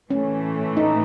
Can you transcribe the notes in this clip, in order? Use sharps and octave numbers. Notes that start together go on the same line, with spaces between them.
A2 E3 A3 C#4
D#4